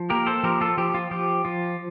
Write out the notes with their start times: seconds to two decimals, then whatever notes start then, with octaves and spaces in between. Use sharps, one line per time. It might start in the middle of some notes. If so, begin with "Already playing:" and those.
Already playing: F3
0.10 A#3 G4 A#4
0.26 A4 C5
0.43 F3 G4 A#4
0.61 F4 A4
0.78 F3 G4
0.94 F4
1.11 F3 G4
1.45 F3 F4